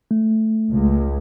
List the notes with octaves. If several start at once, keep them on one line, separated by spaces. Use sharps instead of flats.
A3
C#2 G#3